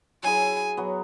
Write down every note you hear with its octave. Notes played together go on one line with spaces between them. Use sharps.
F#3 E4 G#4 G#5
F#3 B3 F#4